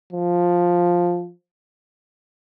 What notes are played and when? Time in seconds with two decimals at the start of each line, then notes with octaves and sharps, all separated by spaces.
0.13 F3